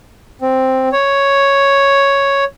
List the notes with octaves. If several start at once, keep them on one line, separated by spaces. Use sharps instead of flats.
C4
C#5